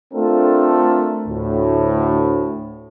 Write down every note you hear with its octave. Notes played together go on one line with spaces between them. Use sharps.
A3 C4 D4 F4 A4 A#4
D2 A2